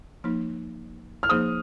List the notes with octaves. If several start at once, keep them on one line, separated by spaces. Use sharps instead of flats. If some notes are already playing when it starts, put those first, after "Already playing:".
F3 A#3 D#4
F6
F3 A#3 D#4 G#4 C5 D#6